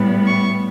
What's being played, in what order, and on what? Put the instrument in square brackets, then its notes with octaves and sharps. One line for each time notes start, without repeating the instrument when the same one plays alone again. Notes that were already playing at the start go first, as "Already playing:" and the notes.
Already playing: [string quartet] A2 G3 B3
C#6